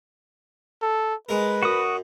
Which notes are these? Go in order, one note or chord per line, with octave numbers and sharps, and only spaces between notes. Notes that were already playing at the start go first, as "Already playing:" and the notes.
A4
G#3 A#4 B4
F#2 F#4 D#6